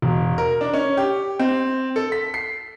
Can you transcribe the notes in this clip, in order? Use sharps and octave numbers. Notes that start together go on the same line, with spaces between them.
E1
A#4
D4
C#4
G4
C4
A4
B6
C7